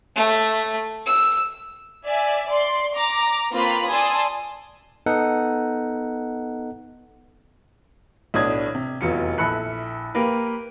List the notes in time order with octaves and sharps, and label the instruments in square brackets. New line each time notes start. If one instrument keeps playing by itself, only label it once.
[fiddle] A3
E6
[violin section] D5 E5 G#5
D5 C6
A#5 D6
A#3 C4 F4 B4 B5
D5 G#5 A5 C6 D#6 E6
[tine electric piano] B3 D#4 A4 F#5
[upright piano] B1 A2 D4 D#6 G#6
C3
F1 E2 F#3 F4 C#7
A#1 E4 A4 B5 F#6 C#7
A#3 G4 A#4 B4